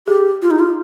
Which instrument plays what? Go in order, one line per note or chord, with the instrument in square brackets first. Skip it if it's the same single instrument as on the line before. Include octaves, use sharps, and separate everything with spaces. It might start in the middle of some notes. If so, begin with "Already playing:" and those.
[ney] G4 [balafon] G#4
[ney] F4
D#4
F4